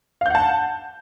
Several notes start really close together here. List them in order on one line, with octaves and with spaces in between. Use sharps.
F5 G6 F#5 A5